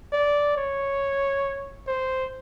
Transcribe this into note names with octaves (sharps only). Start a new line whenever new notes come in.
D5
C#5
C5